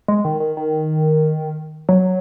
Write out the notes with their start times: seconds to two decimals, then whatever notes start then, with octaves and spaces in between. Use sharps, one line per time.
0.08 G#3
0.24 D#3
0.40 D#3
0.57 D#3
1.89 F#3